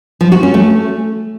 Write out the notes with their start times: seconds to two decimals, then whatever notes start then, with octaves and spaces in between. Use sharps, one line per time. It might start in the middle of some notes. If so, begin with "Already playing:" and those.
0.21 F3
0.32 F#4
0.43 C#4
0.54 A3